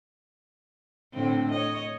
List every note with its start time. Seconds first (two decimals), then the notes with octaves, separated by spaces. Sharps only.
1.14 A2 D3 C4
1.51 C#5 D#5